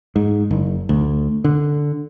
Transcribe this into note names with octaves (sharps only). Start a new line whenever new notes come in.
G#2
F#1
D2
D3